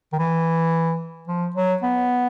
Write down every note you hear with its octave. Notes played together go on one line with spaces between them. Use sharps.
D#3
E3
F3
F#3
B3